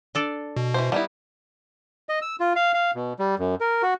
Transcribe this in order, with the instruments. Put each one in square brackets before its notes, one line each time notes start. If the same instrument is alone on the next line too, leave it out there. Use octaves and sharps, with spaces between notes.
[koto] D4 A4 D5
[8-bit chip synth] B2
[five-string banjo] E3 A3 C5
[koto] G3 [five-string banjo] B3 D#4 E4
[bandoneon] D#5
E6
F4
F5
F5
B2
G3
F#2
A#4
F#4